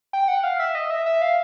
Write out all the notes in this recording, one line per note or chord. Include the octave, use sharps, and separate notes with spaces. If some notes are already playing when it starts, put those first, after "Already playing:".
G5
F#5
F5
E5
D#5
E5
E5
F5